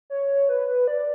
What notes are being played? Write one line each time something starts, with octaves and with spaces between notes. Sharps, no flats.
C#5
B4
D5